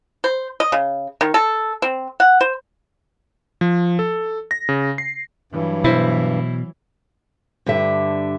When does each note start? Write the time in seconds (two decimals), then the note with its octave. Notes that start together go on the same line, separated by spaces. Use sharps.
0.24 C5
0.60 D#5
0.72 C#3
1.21 D#3
1.34 A4
1.82 C4
2.20 F#5
2.41 C5
3.61 F3
3.99 A4
4.51 A#6
4.69 C#3
4.98 C7
5.52 G2 E3 F#3
5.84 B2 E4 C5
7.66 G2 D3 G4 E5